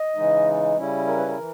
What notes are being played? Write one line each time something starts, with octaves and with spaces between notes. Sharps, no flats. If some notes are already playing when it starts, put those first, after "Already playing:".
Already playing: D#5
C#3 E3 G#3 D#4
C#3 G3 C#4 E4
A#4
B4
A#4
E3